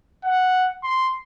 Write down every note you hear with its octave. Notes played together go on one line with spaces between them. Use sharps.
F#5
C6